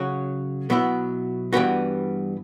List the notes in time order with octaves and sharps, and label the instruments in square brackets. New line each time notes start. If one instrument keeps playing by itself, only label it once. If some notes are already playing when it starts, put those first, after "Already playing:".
Already playing: [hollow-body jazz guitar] C#3 F#3 C#4 F#4
B2 F#3 B3 E4
G2 E3 G3 B3 F#4